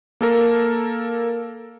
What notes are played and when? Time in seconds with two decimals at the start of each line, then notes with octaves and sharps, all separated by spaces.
0.21 A#3 A4 A#4